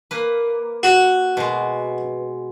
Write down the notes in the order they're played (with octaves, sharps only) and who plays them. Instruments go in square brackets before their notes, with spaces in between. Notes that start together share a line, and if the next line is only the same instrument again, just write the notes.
[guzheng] A#3 B4
[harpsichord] F#4
[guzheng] B2 G#3